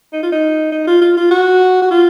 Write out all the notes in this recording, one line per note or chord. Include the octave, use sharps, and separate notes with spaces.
D#4
F4
D#4
D#4
F4
F4
F4
F#4
F#4
F4